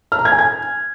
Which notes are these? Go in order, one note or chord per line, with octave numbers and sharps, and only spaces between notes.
F6
A#5
G#6
G#5
G#6